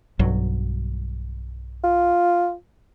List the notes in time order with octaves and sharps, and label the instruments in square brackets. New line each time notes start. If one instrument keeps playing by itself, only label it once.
[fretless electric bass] B1 G2 F#3
[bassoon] F4